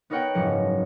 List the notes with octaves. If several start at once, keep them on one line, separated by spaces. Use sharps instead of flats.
B3 D#4 A#4 C#5 F#5 G5
F#1 G#2 F3 C#7